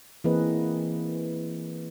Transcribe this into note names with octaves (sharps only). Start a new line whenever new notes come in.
E3 A#3 C4 G#4 B4 D#5